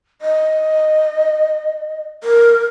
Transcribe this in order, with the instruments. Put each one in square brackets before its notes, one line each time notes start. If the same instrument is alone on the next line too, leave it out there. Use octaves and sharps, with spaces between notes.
[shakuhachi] D#5
A#4